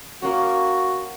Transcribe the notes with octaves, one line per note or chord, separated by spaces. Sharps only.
A#3 C#4 F#4